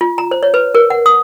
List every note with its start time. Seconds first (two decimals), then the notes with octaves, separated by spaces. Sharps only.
0.01 F4
0.18 A#5
0.31 C5
0.43 C#5
0.54 B4
0.75 A#4
0.90 F#5
1.06 D#6